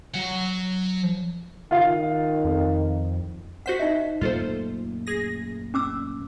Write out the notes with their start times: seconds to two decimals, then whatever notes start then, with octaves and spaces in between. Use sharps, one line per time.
0.14 F#3 F#5
1.71 D#3 F4 F5
2.44 F2
3.66 F#4 C5 F#5 B6
3.79 D#4 D#5 E5
4.21 F#2 A#2 A3 F4 A4 C5
5.07 G#4 A#6
5.74 C#4 D6 E6